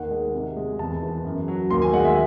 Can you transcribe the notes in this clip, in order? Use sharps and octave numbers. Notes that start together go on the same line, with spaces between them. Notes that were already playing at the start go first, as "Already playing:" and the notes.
Already playing: D#2 D#3 F#5
G#3
C3
G#3
E2 A5
E3
F#2
F#3
D#2 C6
G#5
G#3 F#5
E5